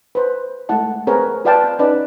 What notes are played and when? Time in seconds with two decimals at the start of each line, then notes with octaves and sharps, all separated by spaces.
0.15 B4 C5
0.69 G#3 A3 E4 F#5 A5
1.07 C4 G#4 A#4 B4 C#5
1.45 F4 B4 D5 F5 G5 A5
1.64 C4
1.79 C#4 D#4 B4 D5